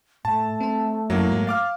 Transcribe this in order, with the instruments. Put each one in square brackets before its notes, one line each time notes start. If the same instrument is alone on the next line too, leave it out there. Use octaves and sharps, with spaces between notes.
[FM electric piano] A2 [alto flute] A3 [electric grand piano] A5
[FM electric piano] C4 C5
[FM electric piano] F#2 C#4 E4 [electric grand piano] F#3 A#3
[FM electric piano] G#2 F#4
[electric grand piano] F5 D6 F6 [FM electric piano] A6